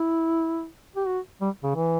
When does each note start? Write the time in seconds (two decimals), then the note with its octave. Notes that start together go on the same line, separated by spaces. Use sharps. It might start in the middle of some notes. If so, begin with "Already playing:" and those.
Already playing: E4
0.96 G4
1.07 F#4
1.41 G3
1.63 C#3
1.75 E3